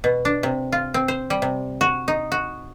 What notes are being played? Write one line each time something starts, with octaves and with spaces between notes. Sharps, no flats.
B2
D4
C3
F4
C4
C5
G3
C3
F#4
D#4
F#4